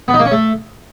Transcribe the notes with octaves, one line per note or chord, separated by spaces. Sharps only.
B3
D#4
A#3
C#4
A3